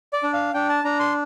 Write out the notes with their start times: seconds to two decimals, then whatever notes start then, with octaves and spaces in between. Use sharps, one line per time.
0.13 D5
0.23 D4
0.33 F5
0.54 D4 G5
0.69 A5
0.84 D4 A#5
0.99 C6